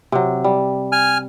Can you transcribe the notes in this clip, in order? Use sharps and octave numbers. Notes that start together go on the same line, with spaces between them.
C3 F#3
G3
G#5 F6